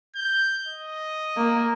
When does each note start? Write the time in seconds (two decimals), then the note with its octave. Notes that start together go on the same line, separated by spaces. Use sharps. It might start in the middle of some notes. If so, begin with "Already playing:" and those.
0.15 G6
0.67 D#5
1.37 A#3